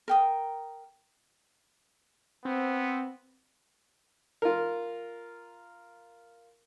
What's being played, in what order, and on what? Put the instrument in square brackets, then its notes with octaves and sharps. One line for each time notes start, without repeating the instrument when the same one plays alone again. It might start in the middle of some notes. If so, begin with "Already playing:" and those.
[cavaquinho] A#4 G5 D#6
[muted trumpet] B3 [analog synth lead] C4
[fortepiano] F4 A#4